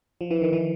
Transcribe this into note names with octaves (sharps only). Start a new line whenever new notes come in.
F3
E3
D#3
E3